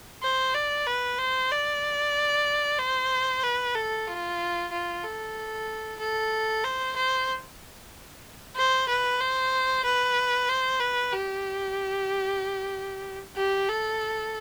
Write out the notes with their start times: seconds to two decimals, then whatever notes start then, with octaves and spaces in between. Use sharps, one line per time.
0.22 C5
0.54 D5
0.86 B4
1.18 C5
1.51 D5
2.78 C5
3.43 B4
3.75 A4
4.07 F4
4.72 F4
5.03 A4
5.99 A4
6.64 C5
6.96 C5
8.56 C5
8.88 B4
9.20 C5
9.84 B4
10.49 C5
10.80 B4
11.12 G4
13.36 G4
13.69 A4